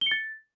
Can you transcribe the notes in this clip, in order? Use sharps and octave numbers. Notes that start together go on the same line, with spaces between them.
G7
C#7
A6